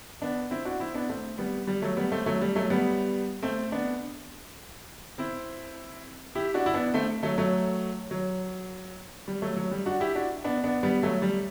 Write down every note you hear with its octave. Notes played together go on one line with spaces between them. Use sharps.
B3 D4
C4 E4
D4 F#4
C4 E4
B3 D4
A3 C4
G3 B3
G3
F#3 A3
G3 B3
A3 C4
F#3 A3
G3
F#3 A3
G3 B3
A3 C4
B3 D4
C4 E4
E4 G4
D4 F#4
E4
B3 D4
A3 C4
F#3 A3
F#3 A3
F#3
G3
F#3 A3
F#3
G3
D4 F#4
E4 G4
D4 F#4
B3 D4
B3 D4
G3 B3
F#3 A3
G3